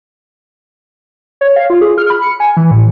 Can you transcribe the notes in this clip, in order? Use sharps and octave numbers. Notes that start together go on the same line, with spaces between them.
C#5
F5
F4
G#4
F6
B5
C#7
G#5
E3
A2